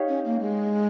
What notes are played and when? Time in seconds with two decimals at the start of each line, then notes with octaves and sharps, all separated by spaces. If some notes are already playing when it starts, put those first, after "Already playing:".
Already playing: D#4 G4 C#5 F5
0.08 C#4
0.25 A#3
0.40 G#3